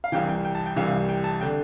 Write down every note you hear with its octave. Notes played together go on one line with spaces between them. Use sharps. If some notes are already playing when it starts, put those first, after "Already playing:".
F5
C2 C3 E3 G5
G5
G5
A5
G5
C2 C3 E3 F5
G5
A5
D3 G5